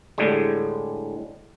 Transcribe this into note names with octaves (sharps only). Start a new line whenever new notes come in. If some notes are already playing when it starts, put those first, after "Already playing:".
A2 D3 G3 G#3